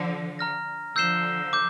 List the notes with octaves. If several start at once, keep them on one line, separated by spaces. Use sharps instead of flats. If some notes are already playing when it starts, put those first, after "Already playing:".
Already playing: D3 F3
A#5 F6 A#6
D3 F3 E6 G6 C7 E7 G7
D6 G6